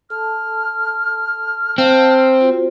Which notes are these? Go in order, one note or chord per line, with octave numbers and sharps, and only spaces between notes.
A4 A5 F6
C4 F5 A5
F4 F#4 C5